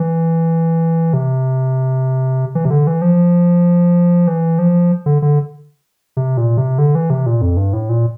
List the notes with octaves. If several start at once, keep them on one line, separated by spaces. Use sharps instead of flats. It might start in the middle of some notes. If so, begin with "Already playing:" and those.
Already playing: E3
C3
E3
C3
D3
E3
F3
E3
F3
D3
D3
C3
A#2
C3
D3
E3
C3
A#2
F2
G2
A2
A#2